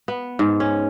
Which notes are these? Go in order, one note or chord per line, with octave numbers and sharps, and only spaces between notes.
B3
G#2
C#4